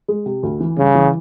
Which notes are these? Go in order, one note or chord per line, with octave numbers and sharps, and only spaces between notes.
G#3
C3
D2
E3
G2 C#3
E3